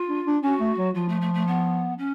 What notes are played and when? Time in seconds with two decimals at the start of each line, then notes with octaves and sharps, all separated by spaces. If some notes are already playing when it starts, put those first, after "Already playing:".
Already playing: F4
0.08 D4
0.26 D4
0.43 C#4 F#4
0.60 A3
0.77 F#3
0.94 F3 F4
1.08 A3
1.21 A3
1.34 A3
1.47 B3
1.98 C#4